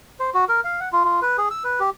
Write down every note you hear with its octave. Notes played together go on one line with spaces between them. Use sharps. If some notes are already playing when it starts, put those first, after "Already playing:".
C5
F#4
A#4
F5
F#5
F4
F4
B4
G#4
E6
B4
G4